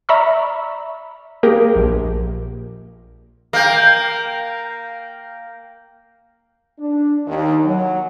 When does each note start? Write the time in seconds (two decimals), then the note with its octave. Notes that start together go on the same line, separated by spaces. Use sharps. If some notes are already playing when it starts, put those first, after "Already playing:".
0.09 D5 E5 A#5 B5 C#6 E6
1.43 A#3 G4 G#4 A#4
1.76 A#1
3.53 A#3 F5 G5
6.79 D4
7.27 D#2
7.65 F#3